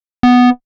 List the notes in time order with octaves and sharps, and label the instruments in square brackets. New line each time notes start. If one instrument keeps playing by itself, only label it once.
[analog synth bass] B3